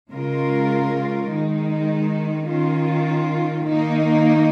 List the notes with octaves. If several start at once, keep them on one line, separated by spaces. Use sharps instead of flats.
C#3 G#3 F4 A#4
D#3 G#3 D#4
D#3 C#4 F4
D#3 A#3 D#4